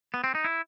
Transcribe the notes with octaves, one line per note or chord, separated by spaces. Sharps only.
B3
C4
D#4
E4